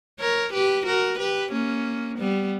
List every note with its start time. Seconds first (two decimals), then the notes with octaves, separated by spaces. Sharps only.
0.20 A#4 C#5
0.53 G4 B4
0.86 F#4 A#4
1.19 G4 B4
1.52 A#3 C#4
2.18 G3 B3